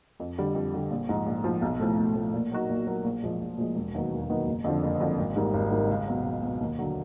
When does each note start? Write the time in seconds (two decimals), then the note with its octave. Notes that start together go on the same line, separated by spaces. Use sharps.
0.20 F2
0.38 D3 G3
0.55 F2
0.74 D3 G3
0.91 A#1
1.09 G#2 F3
1.26 A#1
1.44 G#2 F3
1.62 B1
1.79 A2 F3 A3
1.98 B1
2.15 A2 F3 A3
2.34 A#2
2.51 F#3 A#3 D#4 F#4
2.69 A#2
2.87 F#3 A#3 D#4 F#4
3.04 A#1
3.23 A#2 F3 G#3
3.41 A#1
3.58 A#2 F3 G#3
3.75 E1
3.94 D#2 D#3 F#3 B3
4.11 E1
4.29 D#2 D#3 F#3 B3
4.47 F#1
4.64 F2 D3 F3
4.82 F#1
5.00 F2 D3 F3
5.19 G#1
5.36 G#2 D#3 G3 A#3
5.54 G#1
5.71 G#2 D#3 G3 A#3
5.90 C#2
6.08 B2 F#3
6.24 C#2
6.43 B2 F#3
6.61 D#2
6.79 D3 F#3